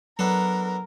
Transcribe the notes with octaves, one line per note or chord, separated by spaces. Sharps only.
F#3 B3 D4 A4 A#4